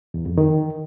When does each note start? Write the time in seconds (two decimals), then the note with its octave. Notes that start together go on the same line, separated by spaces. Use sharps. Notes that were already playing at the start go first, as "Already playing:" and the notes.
0.14 E2
0.26 F2
0.38 D#3